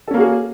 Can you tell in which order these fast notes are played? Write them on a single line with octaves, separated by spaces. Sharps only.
A4 C#4 A#3 F#4 G#4